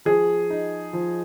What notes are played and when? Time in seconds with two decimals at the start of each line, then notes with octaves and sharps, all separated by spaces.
0.05 F3 G#4
0.50 D#4
0.93 F3